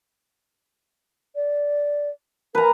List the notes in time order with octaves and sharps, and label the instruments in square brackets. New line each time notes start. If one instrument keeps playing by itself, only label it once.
[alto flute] D5
[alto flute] A#4 [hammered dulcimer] B4 A#5